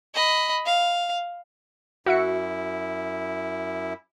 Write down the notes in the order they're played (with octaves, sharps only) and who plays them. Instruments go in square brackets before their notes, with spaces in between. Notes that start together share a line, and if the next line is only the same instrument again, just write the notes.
[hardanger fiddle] D#5 B5
F5
[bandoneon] F#2 E4 [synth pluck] F#4 E5 C#7